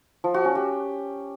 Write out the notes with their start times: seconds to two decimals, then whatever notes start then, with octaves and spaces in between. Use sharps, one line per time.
0.24 F3
0.34 F#4
0.45 C#4
0.55 G4